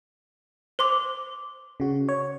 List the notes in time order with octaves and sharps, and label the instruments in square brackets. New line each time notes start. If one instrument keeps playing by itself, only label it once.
[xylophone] C5 C6 D6
[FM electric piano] C#3 F#4
C#5